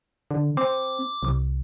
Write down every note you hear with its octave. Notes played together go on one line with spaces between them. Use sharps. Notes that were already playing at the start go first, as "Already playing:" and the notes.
D3
C4 D6
C2